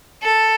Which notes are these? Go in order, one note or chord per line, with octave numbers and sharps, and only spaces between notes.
A4